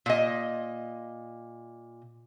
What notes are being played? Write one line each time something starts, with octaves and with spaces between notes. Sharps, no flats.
A#2 D#5